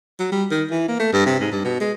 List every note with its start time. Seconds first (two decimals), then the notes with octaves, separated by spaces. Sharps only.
0.20 F#3
0.32 G3
0.51 D#3
0.71 E3
0.88 A#3
1.00 A3
1.13 G2
1.26 C3
1.40 G#2
1.52 G2
1.65 B2
1.81 G#3